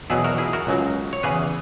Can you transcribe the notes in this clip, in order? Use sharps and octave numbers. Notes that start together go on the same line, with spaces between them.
E2 B2 F#3 E4 G#4
F#4 A#4
E4 G#4
F#4 A#4
C#2 C#3 F#3
C#5
E2 C#3 E3 G#4 B4